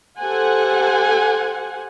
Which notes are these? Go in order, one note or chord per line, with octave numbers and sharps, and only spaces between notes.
G4 A4 C5 F#5 G#5